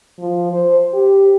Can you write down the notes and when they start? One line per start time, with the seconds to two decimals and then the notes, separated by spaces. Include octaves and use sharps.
0.19 F3
0.52 C5
0.94 G4